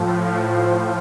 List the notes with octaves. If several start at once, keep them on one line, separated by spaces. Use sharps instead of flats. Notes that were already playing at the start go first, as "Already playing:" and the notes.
Already playing: A2 F3
C5